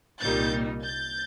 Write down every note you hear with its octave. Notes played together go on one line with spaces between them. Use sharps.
C2 A#2 G3 A#3 D#4 G6 A6
G6 A6